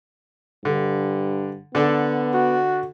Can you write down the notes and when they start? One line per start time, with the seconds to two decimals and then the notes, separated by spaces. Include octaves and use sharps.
0.65 G2 D3
1.75 D3 B3 D4 A4
2.34 F#4